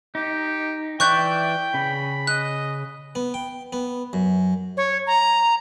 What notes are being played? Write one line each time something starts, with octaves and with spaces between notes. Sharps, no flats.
D#4 G4
E3 D5 E5 G5 C#6 F#6 G6
C#3 B5
D#5 F#6
B3
G5
B3
F#2
C#5
A#5